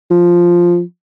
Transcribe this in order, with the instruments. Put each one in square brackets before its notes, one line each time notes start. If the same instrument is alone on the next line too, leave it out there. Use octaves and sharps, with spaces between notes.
[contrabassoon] F3